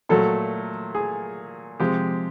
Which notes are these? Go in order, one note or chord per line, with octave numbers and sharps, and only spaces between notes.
A#2 F#3 A3 A4
G#4
C3 F3 G#3 G4